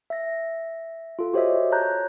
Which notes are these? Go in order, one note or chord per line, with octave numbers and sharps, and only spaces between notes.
E5 A#6
F4 A4
F#4 G4 C5 C#5 D#5 E5
C#5 A5 A#5 F#6 G6